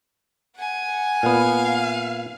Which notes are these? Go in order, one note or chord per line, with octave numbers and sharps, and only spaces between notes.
F#5 G#5
A#2 B3 F5